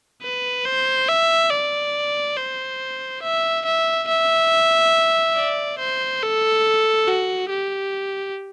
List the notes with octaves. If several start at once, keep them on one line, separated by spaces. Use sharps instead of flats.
B4
C5
E5
D5
C5
E5
E5
E5
D5
C5
A4
F#4
G4